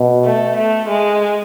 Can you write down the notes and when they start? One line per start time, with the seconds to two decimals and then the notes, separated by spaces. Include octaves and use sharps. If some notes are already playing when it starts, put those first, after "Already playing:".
Already playing: B2
0.25 A3
0.57 A3
0.89 G#3